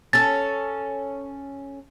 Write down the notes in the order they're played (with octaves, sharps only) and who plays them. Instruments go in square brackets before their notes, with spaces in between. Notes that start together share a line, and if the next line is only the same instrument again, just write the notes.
[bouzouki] C#4 A4 [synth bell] A6